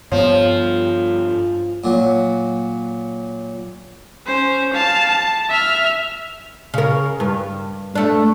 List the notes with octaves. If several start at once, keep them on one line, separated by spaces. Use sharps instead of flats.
G2 F3 B3 C#5
A#2 F#3
C#4 C5
F5 A5
A5
E5 F6
C#3 A#4
G2
A3 D4